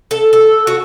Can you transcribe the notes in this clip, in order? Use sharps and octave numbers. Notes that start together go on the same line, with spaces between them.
A4
A4
F#4